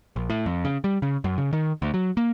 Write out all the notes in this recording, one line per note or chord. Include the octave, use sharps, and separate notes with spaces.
A#1
A2
F2
C#3
G3
C#3
F#2
C#3
D#3
D2
F#3
A#3